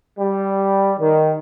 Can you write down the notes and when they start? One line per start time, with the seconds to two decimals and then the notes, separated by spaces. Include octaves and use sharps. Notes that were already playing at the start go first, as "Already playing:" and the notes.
0.18 G3
1.00 D#3